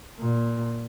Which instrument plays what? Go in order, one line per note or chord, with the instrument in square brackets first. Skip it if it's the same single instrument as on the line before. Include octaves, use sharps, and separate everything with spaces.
[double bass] A#2